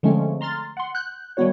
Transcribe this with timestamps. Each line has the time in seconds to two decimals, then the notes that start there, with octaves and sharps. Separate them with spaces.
0.03 D3 F3 G#3 A3 C4 C#4
0.41 A#5 C6 F6 A6
0.77 F#5 C6
0.95 F#6 G6
1.37 D#3 G3 A3 B3 F#4 C#5